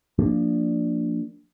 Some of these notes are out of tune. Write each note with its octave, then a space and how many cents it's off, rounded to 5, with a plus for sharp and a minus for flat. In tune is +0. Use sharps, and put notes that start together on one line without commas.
F3 +0 A#3 -15 D4 +0